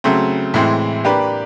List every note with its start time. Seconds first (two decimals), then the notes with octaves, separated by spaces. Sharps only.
0.04 C#3 F#3 A3 C4
0.54 A2 E3 G#3 C4 E4
1.04 A#3 D4 G4 B4